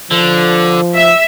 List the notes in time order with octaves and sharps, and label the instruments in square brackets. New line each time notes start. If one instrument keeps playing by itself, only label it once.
[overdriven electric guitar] D3 [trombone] F3
[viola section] E5